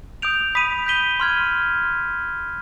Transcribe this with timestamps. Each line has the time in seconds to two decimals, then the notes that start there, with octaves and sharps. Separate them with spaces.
0.22 D#6 G6 D7 F7
0.55 B5 D#6 B6 D#7
0.86 G6 B6 D#7 G7
1.20 C6 F6 G#6